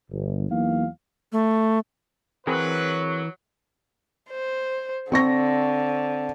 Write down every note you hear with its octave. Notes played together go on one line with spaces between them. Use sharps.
G1
E2 E3 F#3 A#3 D#4 F5
A3
E3 F#3 C4 G#4 A#4 B4
C5
D3 C4 C#6 A#6